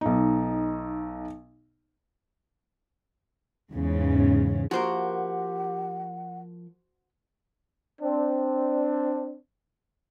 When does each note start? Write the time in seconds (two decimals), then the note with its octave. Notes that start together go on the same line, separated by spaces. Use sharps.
0.01 B1 D#4
3.72 E2 G#2 C#3
4.71 F3 A#3 F#4 G4 A#4 C5 F#5
8.02 C4 D4